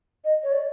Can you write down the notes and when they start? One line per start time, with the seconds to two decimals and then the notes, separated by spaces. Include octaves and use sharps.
0.24 D#5
0.43 C#5
0.53 D5